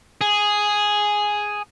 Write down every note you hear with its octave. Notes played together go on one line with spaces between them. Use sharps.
G#4